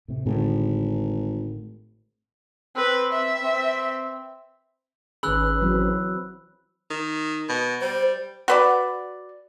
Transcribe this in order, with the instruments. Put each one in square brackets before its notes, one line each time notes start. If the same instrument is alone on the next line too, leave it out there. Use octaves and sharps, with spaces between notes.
[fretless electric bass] A2 C3
[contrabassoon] G#1 [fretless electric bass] A2 D3
[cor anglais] C4 [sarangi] B4
[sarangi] E5
[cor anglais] C4
[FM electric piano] G#1 D#3 G#4 [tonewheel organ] C#4 B4 [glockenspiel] B5 E6 F#6
[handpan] E3 F#3 C4
[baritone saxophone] D#3
B2
[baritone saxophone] G3 [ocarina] C5
[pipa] F#4 B4 D5